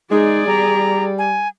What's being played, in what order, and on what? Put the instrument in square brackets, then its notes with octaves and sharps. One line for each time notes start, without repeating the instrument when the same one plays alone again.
[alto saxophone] G#3 [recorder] D#4 [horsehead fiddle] G#4 D5
[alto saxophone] G3 [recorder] A#5
[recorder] G#5